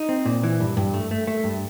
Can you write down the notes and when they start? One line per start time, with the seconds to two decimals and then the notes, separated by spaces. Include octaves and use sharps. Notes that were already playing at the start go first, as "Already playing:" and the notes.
Already playing: D#4
0.09 C4
0.26 A#2
0.43 E3
0.60 G2
0.77 G2
0.94 A3
1.11 A3
1.27 A3
1.44 G2